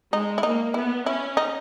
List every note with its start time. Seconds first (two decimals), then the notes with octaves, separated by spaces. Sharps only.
0.13 G#3 D#4
0.38 E4
0.43 A#3 D#4
0.74 B3 E4
1.06 C#4 E4
1.37 D#4